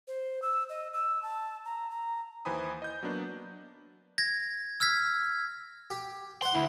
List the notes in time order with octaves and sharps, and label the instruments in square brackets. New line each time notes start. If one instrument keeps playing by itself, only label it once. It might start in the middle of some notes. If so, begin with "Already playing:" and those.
[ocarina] C5
E6
D#5
E6
A5
A#5
A#5
[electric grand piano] D#2 E3 C5 G#5 B5 D#6
D#5 G6
F#3 A#3 B3 D4
[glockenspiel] G#6 A#6
E6 F6 G#6 B6
[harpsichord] G4
[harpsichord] C5 F#5 [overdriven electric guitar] C6
[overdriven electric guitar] D2 [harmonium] E4